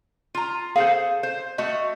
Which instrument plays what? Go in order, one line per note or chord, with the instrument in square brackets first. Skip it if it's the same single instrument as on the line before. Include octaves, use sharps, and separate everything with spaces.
[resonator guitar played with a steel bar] F4 A#5
[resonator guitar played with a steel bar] G#4 A4 C5 [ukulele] F5
[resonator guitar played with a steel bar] C5
A3 F#4 D#5